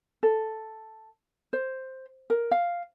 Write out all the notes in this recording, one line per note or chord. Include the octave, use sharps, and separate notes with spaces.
A4
C5
A#4
F5